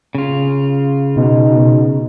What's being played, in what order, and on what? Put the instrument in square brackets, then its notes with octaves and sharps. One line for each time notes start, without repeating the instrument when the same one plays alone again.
[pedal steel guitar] C#3 F4
[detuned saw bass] B2 [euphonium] D#4